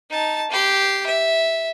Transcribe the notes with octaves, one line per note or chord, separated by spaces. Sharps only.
D#4 A5
G4 C6
E5